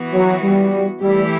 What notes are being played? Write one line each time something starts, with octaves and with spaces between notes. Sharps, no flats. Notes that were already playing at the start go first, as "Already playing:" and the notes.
Already playing: E3 B3 F#4
F#3
G3
E3 G3 A3 E4 G4